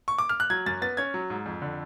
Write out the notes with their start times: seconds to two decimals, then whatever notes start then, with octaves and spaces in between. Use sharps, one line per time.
0.08 C#6
0.18 D6
0.29 F6
0.40 F#6
0.50 F#3 G#6
0.66 F#2 A6
0.82 B3 A6
0.97 C#4 G#6
1.14 F#3
1.30 G#2
1.46 F2
1.62 D3